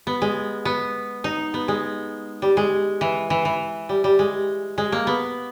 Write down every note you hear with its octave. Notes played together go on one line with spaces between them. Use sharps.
B3
G#3
B3
D#4
B3
G#3
G3
G#3
E3
E3
E3
G3
G3
G#3
G#3
A#3
B3